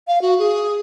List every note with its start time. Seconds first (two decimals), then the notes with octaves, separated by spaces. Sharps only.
0.08 F5
0.22 F#4
0.39 G#4